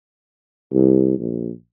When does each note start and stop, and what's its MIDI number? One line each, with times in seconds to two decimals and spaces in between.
0.72 1.15 36
1.19 1.50 34